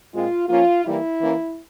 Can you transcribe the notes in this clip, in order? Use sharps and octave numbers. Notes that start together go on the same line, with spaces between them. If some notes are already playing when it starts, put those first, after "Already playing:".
A#2 G#3 C4 F4
F3 A#3 C#4 F4
E3 G3 A#3 E4
E3 A#3 C#4